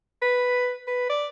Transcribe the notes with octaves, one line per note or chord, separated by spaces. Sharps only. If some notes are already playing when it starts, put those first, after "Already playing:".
B4
B4
D5